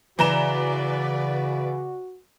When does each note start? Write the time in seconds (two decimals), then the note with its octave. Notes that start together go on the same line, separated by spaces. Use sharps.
0.19 C#3 E3 F#4 B4 D5 A#5 E7